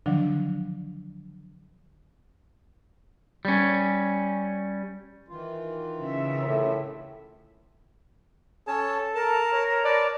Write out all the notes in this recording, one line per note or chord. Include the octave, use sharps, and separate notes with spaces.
D3 D#3 F3 F#3 D4
G3 C#4
D#3 E3 F4
C#3 E5
A2
C#4 A4 C#5 A5
A#4 A5
C#5
B4 D5 A5